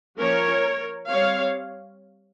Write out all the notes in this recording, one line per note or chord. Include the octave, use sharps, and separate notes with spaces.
F3 A#3 C#4 A#4 C#5
G3 C4 C#5 F5